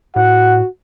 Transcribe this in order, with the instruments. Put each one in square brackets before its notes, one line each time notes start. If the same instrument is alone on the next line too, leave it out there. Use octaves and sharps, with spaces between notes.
[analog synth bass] A2 [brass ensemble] F#4 [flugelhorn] F#5